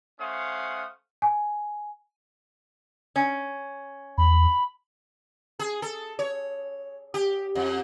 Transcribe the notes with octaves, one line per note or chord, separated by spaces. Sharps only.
A3 C#4 C5 F5 F#5 D#6
G#5
C#4
E2 B5
G#4
A4
C#5
G4
F2